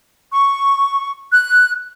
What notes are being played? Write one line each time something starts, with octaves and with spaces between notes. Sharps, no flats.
C#6
F#6